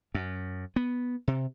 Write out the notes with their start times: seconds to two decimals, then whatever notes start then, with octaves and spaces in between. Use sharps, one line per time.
0.15 F#2
0.76 B3
1.28 C3